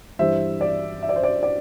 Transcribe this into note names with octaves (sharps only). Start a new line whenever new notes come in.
G2 E3 G3 C5 E5
D5
E5
D5
C5
D5
D5